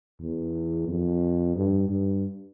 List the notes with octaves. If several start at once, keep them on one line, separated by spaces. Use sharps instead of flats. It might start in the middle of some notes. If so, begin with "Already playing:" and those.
E2
F2
G2
G2